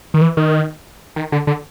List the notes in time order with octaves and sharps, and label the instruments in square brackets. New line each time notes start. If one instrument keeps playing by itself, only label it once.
[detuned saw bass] D#3
E3
D#3
D#3
D3
D3